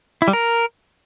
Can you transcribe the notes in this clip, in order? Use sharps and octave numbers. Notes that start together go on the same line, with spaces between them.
E4
G3
A#4